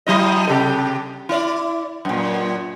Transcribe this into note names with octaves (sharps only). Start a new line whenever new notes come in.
F#3 E4 D#5
C3 G4 A4
E4 D5
F#2 A#2